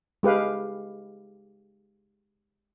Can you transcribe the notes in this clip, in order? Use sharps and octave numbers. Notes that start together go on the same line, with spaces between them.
G#3 G4 B4 F5